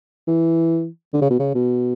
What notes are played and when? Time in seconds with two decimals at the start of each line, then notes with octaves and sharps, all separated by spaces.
0.28 E3
1.13 D3
1.21 C#3
1.30 B2
1.39 C#3
1.55 B2